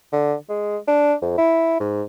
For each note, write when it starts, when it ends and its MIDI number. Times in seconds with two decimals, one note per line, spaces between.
0.12 0.35 50
0.49 0.77 56
0.87 1.14 62
1.22 1.35 41
1.38 1.76 64
1.80 2.03 44